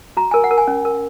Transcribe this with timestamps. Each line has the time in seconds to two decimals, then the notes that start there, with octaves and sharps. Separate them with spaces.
0.17 F#4 A#5
0.31 A#4 G#5
0.44 F#5
0.51 A#4
0.58 G#5
0.67 C#4
0.85 A#4